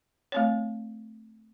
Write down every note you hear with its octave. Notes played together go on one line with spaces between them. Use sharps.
A3 C4 C#5